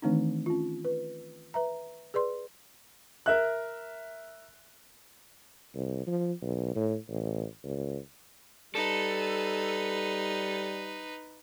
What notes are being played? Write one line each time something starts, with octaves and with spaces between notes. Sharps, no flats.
D#3 E3 A3 C4 D4 D#4
C#4 F4
B4
B4 E5 A#5
G#4 B4 D5 C6
A#4 E5 F#6
C2
F3
B1
A2
A1
C#2
G3 D#4 A4 B4